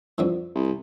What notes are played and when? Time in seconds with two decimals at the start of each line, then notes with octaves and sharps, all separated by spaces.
0.18 F2 D3 E3
0.55 C2